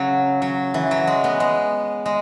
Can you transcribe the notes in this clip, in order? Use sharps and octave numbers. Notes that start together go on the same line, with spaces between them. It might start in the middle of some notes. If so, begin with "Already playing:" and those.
Already playing: C#3 F#3
F#3
E3
F#3
G#3
B3
G#3
G#3